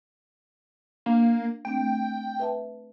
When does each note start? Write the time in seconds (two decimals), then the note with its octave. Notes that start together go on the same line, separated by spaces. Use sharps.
1.06 A#3 D4
1.65 A3 C4 D4 G5
1.78 A3
2.40 B4 E5 A5